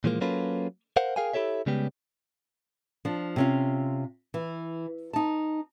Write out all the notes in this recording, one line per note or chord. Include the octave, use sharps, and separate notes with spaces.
A#2 E3 F3 G#3 A#3
F#3 A#3 C#4 F4 A4 B4
A#4 C5 F5 F#5
G#4 A#4 F5 G5 G#5
E4 G4 A4 C#5 E5
C#3 G3 G#3 B3 G4
F3 D4
C3 C#4 F4
E3
D#4 A5